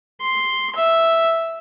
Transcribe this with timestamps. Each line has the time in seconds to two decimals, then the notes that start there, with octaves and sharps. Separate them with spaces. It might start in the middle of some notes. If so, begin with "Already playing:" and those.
0.22 C6
0.76 E5